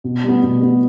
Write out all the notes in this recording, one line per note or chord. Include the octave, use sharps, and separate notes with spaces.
B2
G3 B3
B2
G3 B3